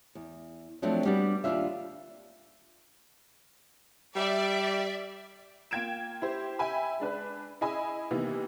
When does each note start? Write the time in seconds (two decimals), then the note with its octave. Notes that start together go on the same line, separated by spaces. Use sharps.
0.15 E2
0.82 F3 F#3 A3 C4 D4
1.05 G3 B3 D4 F#4 D5
1.44 D#2 F#3 G3 D4 F4 E5
4.15 G3 D5 E5
5.71 A#3 F4 G5 G#6 D7 E7
6.22 E4 G4 C5
6.59 E5 G5 G#5 B5
7.00 G#3 D4 B4
7.61 E4 G#4 D#5 G#5 B5 E6
8.11 C3 D#3 E3 A#3 B3